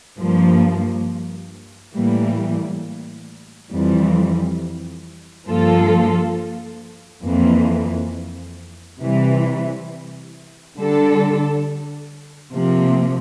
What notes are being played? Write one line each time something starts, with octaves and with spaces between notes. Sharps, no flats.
G2 F3 A#3
A2 E3 G3 A#3
F2 E3 G3
G2 F3 A#3 F4 A4
F2 E3 A#3
C3 E3 G3
D3 G3 D4 A4
C3 F3 A#3